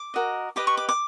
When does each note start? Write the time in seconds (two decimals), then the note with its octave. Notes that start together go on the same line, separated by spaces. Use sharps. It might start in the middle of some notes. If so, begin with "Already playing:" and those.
Already playing: D6
0.14 F#4 A#4 D#5
0.56 G4 B4 D#5 D6
0.67 C#6
0.77 D6
0.89 D6